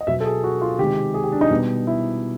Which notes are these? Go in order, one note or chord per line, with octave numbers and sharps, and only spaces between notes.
D#5
B2 F#3 B3 E5
A4
G#4
F#4
F4
C3 D#3 G#3 G4
G#4
G4
D4
D#4
B2 G3 B3
E4